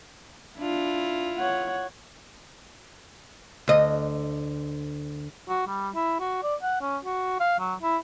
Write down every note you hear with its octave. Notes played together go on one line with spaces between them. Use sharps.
D4 E4 F4
C#5 F#5
D2 D#5
F#4
G3
E4
F#4
D5
F#5
C#4
F#4
F5
F#3
E4